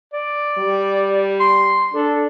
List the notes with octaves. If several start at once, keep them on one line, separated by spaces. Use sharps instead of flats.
D5
G3
C6
D4 A4